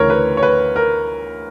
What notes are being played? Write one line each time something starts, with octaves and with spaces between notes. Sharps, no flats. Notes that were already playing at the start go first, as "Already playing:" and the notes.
Already playing: D2 C#3 E3 A#4 C#5
B4
C#5
B4
A#4